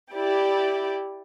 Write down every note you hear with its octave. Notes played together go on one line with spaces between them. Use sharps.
E4 G4 D5